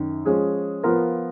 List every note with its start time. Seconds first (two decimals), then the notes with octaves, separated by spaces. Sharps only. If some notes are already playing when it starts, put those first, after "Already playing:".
Already playing: F#2 D#3
0.25 F3 G#3 C#4 G#4
0.83 F3 B3 F4 A#4